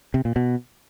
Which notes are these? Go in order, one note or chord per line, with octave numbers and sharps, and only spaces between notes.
C3
A#2
B2